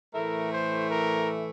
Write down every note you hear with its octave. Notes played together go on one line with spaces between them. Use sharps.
A2 E3 A3 E4 A#4
C5
A#4